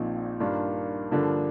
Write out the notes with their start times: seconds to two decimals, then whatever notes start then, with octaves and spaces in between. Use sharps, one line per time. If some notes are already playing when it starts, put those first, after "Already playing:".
Already playing: A#1 A#2 F3 C4 D#4
0.40 G2 D#3 A#3 D4 F4
1.11 G2 D3 F3 A#3 D4